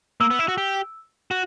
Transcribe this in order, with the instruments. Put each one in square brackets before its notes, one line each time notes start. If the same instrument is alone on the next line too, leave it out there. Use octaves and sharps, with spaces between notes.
[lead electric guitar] A#3 [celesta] E6
[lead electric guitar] B3
E4
F#4
G4
F#4